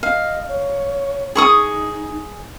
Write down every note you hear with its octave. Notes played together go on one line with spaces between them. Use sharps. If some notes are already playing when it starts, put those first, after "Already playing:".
D#5 F5
C#5
D#4 G#4 C#6 D#6